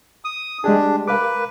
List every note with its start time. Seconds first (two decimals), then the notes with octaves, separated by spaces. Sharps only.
0.25 D#6
0.64 G#3 D4 G4 G#4
1.08 A#4 B4 F5 D6